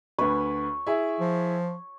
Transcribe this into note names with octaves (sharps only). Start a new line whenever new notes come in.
D2 B4 C#5
E4 G#4 E5
F3